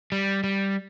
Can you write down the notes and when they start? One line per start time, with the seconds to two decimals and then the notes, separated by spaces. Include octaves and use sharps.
0.12 G3
0.44 G3